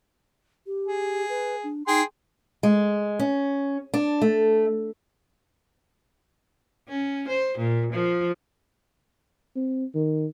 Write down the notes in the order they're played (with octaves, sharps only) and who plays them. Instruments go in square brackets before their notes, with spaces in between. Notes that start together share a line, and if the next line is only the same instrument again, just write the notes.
[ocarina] G4
[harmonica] G#4
[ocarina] B4
D4
[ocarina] D#4 [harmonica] G#4 G5 C6
[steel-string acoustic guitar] G#3
C#4
D4
A3
[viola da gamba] C#4
C5
A#2
F3
[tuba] C4
D#3